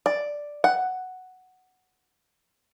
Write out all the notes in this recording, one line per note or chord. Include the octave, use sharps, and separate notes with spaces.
D5
F#5